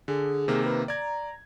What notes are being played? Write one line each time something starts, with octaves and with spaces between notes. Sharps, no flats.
D3 G#4
C3 D#3 A#3
B4
D5 A#5 G#6